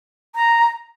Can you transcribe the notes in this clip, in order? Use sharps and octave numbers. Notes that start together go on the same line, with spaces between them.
A#5